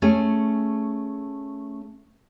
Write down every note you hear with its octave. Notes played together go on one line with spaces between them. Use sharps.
A3 C#4 G#4 G#5